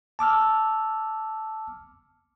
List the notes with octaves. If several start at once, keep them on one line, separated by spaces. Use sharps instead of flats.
A5 D6 E6 F6